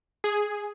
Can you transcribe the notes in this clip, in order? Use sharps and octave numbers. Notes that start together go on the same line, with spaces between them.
G#4